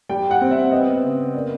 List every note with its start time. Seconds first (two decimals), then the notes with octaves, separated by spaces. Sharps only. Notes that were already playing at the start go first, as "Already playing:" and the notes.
0.09 G3 G5
0.31 F#5
0.41 C4
0.51 E5
0.71 B3 D#5
1.04 C#3
1.34 A#3 D5